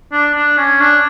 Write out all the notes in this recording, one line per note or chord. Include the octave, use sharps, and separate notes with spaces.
D4
D4
C#4
D4